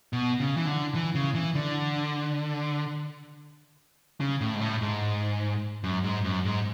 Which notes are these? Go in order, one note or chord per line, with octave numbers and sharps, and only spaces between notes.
B2
C#3
E3
D3
E3
C#3
E3
D3
C#3
A2
G#2
A2
G#2
F#2
G#2
F#2
G#2